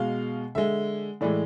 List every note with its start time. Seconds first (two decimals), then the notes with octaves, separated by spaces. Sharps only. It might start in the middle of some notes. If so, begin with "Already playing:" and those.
Already playing: B2 G#3 F5
0.55 D3 G#3 E5
1.21 A2 E3 G#3 D5